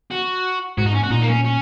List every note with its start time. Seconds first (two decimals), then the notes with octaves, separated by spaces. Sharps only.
0.11 F#4
0.78 G#2 F#4
0.86 D#4
0.94 C#4
1.03 F#4
1.11 A#2 D#4
1.22 A#3
1.28 C#4
1.45 C#4